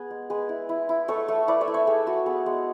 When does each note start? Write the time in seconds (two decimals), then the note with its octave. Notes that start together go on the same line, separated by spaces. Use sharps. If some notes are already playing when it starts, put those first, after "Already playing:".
Already playing: B3 G#4
0.11 G#3
0.30 G#3 G#4 B4
0.49 E4
0.69 E4
0.89 E4
1.08 A3 A4 C#5
1.28 A3
1.48 E4 B4 D5
1.61 C#5 E5
1.68 E4
1.74 C#5 E5
1.87 A3 G#4
2.07 A3 F#4
2.26 B3 G#4
2.46 G#3